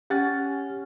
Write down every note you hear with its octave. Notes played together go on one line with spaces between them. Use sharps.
C#4 G4 F#5 A6